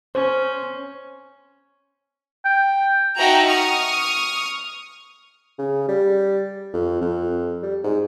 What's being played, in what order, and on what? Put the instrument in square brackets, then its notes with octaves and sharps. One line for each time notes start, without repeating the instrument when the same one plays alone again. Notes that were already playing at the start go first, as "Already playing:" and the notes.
[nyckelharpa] C#4 [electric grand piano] C5
[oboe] G5
[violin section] D#4 F#4 E5 G5 A5 A#5
C#6 D#6 F6
[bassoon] C#3
G3
F2
F2
G3
G#2